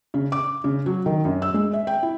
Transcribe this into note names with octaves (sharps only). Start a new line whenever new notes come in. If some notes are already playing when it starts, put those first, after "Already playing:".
C#3
D6
C#3
F#3
D#3
F#2
E6
G#3
E5
G5
E4